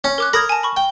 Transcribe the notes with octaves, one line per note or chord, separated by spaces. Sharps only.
C#4
A#4 D6 F#6
A#4 B5 D#6 G#6
G#5 A5
B5 C#6
G5